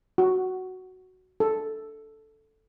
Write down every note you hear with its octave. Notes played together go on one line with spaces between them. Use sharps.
F#4
A4